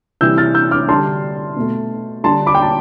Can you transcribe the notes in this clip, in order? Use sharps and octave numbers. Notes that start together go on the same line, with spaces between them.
C3 E3 G3 E6 G6
F6 A6
E6 G6
D6 F6
D3 G3 A5 C6
B2 A3
D3 G3 A5 C6
B5 D6
G5
A5